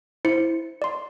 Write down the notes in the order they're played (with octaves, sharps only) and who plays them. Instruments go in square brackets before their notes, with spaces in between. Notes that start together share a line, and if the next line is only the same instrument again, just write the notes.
[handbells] E4 C5 C#7
D5 C6